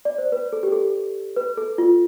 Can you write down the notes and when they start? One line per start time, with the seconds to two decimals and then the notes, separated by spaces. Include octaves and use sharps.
0.05 D5
0.18 C5
0.32 B4
0.53 A4
0.63 G4
0.72 A4
1.36 B4
1.57 A4
1.78 F4